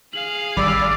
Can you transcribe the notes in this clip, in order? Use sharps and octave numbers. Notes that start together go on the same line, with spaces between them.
G#4 F5 F#7
G#1 G3 D5 B5 D6 E6